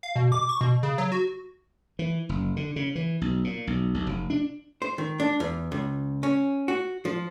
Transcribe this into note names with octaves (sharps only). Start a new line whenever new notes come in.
F5
B2
D6
C#6
B2
C#3
F#3
F#4
E3
F#1
D3
C#3
E3
B1
A#2
B1
B1
F1
D4
C5
D#3
D4
E2
C#2
C#4
F#4
F3